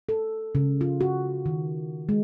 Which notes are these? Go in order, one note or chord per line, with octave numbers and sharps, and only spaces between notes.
A4
C#3
F4
F#4
D#3
G#3